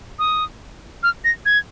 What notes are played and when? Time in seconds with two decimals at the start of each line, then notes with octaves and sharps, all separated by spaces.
0.19 D#6
1.03 F6
1.24 A#6
1.46 G#6